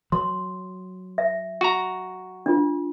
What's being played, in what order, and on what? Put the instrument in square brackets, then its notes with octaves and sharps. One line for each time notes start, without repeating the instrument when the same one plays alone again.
[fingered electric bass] F#3 [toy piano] C6
[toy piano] E5
[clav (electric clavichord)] F#4 A#5
[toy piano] D4 F4